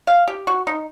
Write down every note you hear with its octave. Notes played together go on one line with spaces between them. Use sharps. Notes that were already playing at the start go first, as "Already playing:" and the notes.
F5
G4
F#4
D#4